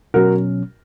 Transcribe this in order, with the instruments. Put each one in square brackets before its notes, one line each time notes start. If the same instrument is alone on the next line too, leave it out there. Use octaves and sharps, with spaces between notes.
[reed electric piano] B2 F#3 C#4 [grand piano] F#4 A#4